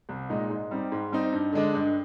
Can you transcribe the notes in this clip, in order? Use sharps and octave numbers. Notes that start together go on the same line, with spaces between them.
C2
A#2 G#3 D#4
G#2
G3 C4 D#4
G#2
G3 C4 D#4
G2
D3 G#3 D4
G2